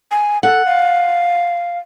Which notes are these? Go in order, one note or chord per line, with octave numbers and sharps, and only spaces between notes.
G#5
A4 F#5
F5